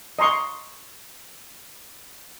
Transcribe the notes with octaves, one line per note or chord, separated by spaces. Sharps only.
D#5 A#5 C6 C#6